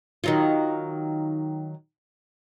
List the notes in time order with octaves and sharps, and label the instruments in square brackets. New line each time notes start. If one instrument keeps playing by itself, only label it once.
[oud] D#3 F#3 F4